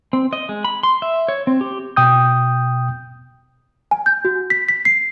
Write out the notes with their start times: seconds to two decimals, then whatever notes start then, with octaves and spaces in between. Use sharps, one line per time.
0.13 C4
0.33 D#5
0.49 G#3
0.65 B5
0.83 C6
1.02 E5
1.28 C#5
1.47 C4
1.61 G4
1.96 B2 G5 D#6 G6
3.91 G#5
4.06 G6
4.25 F#4
4.50 B6
4.69 B6
4.85 C7